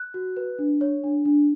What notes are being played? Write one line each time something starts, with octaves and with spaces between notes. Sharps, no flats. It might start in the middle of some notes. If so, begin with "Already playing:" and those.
Already playing: F#6
F#4
B4
D4
C#5
D4
D4